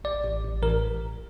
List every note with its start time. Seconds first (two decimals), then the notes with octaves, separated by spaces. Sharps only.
0.04 A1 D5
0.24 A1
0.43 A1
0.63 A1 A#4